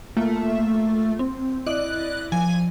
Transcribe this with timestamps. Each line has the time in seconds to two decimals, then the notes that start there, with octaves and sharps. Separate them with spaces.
0.17 A3 A#3 F4
1.19 C4
1.66 E4 D5 D#5 F#6
2.32 F3 G#5